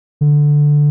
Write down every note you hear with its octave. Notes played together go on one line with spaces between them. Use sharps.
D3